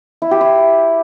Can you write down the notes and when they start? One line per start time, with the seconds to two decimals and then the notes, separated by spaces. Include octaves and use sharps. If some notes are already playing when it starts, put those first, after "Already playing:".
0.22 E4
0.31 G4
0.41 E4